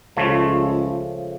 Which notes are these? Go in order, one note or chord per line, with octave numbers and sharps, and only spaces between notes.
C#2 C#3 F3 A3